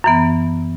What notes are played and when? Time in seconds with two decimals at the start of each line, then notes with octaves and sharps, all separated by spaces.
0.04 F#2 E3 B3